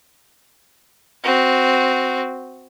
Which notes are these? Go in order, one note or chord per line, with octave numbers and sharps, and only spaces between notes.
C4 F#4